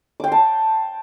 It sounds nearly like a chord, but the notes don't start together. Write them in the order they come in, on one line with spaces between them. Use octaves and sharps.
D6 G5 C6 A5